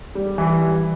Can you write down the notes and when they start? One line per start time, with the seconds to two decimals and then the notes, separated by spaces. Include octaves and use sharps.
0.15 G3
0.38 E3
0.61 G3